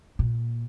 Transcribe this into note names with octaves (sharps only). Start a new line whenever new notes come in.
A#2